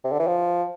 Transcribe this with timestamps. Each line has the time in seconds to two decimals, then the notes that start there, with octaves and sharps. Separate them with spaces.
0.04 C3
0.12 D3
0.19 E3
0.27 F3